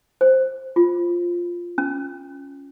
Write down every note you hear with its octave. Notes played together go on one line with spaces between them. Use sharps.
C5
F4
C#4